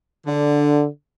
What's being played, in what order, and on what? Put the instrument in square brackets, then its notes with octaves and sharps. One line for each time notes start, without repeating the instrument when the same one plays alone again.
[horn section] D3